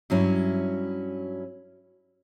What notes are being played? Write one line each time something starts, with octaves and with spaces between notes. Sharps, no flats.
G2 F#3 C#4 E4